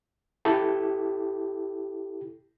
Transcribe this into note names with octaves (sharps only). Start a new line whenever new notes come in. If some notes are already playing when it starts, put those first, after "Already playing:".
E4 G4 A4